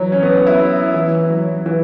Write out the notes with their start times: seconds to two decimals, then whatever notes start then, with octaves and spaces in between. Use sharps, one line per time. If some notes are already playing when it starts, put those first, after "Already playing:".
Already playing: E3 F#3
0.12 C#4
0.23 B3
0.47 E4
0.94 E3
1.30 F#3
1.66 E3